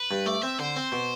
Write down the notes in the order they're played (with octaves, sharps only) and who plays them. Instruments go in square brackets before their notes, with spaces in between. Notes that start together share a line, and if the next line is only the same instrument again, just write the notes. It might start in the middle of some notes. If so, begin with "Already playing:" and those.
Already playing: [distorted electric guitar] B4
[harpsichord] G2
[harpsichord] A3 [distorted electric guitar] D5
[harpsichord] C4 [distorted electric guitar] E5
[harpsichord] D3 [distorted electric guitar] C5
[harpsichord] C4
B2